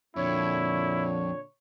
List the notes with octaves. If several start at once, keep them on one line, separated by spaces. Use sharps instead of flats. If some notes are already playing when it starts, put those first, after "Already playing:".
F2 A#2 D3 D4 E4 C#5